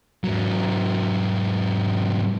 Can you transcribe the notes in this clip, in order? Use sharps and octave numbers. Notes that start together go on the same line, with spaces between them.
G#2 F#3